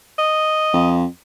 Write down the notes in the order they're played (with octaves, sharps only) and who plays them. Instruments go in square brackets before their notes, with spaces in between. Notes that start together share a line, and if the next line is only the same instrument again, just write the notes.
[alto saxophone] D#5
[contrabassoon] F2